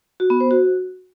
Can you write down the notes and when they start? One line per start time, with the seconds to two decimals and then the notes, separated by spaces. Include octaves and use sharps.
0.20 F#4
0.30 B3
0.40 C5
0.51 F#4